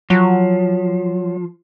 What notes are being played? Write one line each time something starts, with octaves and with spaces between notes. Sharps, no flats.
F3 F#3